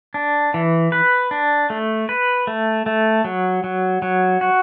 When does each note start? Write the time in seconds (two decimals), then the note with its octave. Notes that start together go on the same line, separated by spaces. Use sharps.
0.14 D4
0.54 E3
0.92 B4
1.31 D4
1.70 A3
2.09 B4
2.47 A3
2.86 A3
3.24 F#3
3.64 F#3
4.02 F#3
4.41 F#4